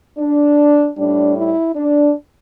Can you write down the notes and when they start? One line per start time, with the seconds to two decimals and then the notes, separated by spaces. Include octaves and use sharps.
0.18 D4
0.97 A2 G3 D4
1.36 E4
1.76 D4